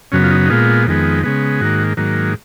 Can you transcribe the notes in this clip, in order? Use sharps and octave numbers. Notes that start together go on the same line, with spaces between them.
F#2 C#3 F#3 B3 C#4
F4
D#4
D#4
A#2 G#3 B3 F4
F2 D#3 G#3 B3
C#3 G#3 B3
G#2 D#3 A#3 F#4
G#2 D#3 F#3 A#3